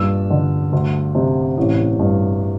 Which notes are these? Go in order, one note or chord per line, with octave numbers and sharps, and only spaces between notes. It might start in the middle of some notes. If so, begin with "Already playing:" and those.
Already playing: G2 A#2 E6
D3
D2
C3
A1
G2